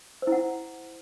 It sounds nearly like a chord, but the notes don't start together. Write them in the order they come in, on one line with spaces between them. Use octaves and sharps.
C5 E4 F#5